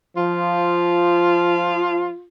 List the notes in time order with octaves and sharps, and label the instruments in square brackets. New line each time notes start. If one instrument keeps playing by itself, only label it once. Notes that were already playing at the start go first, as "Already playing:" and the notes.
[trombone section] F3 [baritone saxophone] F4